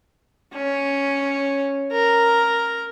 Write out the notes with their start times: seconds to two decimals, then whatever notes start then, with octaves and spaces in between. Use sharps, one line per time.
0.54 C#4
1.92 A#4